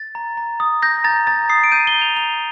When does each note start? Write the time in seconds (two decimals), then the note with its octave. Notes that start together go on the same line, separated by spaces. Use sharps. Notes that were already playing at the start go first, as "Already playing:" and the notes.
Already playing: A6
0.15 A#5
0.37 A#5
0.60 D#6
0.82 G6 A#6
1.04 A#5 A6
1.27 A#5 A6
1.49 D#6 C7
1.64 D7
1.72 G6 D#7
1.87 G7
1.95 A#5
2.01 F7
2.16 A#5 F7